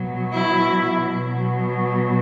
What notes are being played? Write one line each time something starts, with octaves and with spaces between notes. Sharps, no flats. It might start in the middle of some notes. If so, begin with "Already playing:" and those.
Already playing: B2 F#3
E4
B2 F#3